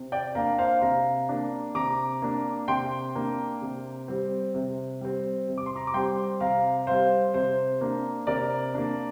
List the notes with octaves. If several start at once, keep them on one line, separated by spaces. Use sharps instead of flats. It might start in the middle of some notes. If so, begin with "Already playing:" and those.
Already playing: C3
D5 G5
A#3 D4 F5 A#5
C5 F5
C3 F5 A#5
A#3 D4
C3 A#5 D6
A#3 D4
C3 G5 C6
A#3 D4
C3
G3 C4
C3
G3 C4
C3
D6
C6
A#5 D6
D6
G3 C4 G5 C6
C3 F5 A#5
G3 C4 C5 F5
C3 C5
A#3 D4
C3 A#4 D5
A#3 D4